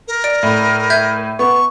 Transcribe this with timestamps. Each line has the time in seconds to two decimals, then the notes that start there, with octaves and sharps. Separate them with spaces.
0.08 A#4
0.24 D5 D7
0.43 A2
0.90 E5 G6 G#6
1.39 B3 C#6